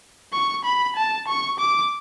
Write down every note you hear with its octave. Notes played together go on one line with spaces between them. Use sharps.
C#6
B5
A5
C#6
D6